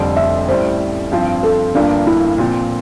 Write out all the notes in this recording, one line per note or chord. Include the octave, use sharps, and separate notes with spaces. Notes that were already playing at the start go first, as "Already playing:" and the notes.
Already playing: F1 F2 D3 G3 C4
E5
A1 A2 G3 C5
G2 F3 C4
A4
G1 G2 F3 A#3 D4
E4
A#2 F3 C4